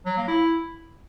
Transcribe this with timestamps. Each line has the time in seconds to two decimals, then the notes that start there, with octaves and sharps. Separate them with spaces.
0.06 F#3
0.17 A#3
0.28 E4